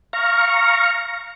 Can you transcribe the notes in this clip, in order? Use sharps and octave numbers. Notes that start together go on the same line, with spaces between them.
F5 A#5 C#6